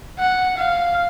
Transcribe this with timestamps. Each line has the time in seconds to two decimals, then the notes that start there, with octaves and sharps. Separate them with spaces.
0.19 F#5
0.58 F5